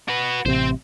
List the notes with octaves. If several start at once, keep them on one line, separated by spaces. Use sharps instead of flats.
F#4 B4
A1 C3 C4 C5